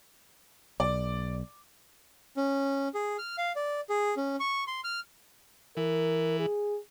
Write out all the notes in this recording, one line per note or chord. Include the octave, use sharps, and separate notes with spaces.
B1 D5
C#4
G#4
F6
F5
D5
G#4
C#4
C#6
C6
F6
E3 A#4
G#4